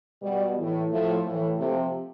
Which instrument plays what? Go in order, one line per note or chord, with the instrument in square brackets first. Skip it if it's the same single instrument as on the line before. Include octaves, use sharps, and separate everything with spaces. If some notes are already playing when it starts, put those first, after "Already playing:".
[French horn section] B2 G3
A2 E3
A2 F3 A3
A2 E3
C3 F3 A3